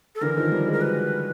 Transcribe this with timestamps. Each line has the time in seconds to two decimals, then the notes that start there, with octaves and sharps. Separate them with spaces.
0.15 A4
0.21 D3 E3 A#4
0.37 D#3 F3
0.52 F3 G3
0.67 F#3 G#3
0.73 A#4
0.81 B4